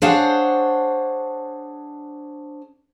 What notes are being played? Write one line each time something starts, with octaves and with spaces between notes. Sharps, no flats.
D4 G#4 C5 C#5 F5 F#5